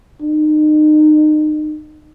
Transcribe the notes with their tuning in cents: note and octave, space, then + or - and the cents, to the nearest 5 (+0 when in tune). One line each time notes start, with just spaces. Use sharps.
D#4 -30